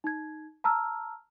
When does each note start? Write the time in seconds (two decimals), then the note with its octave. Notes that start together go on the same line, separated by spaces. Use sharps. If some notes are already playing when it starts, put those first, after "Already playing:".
0.04 D#4 G#6
0.64 A5 A#5 E6 F6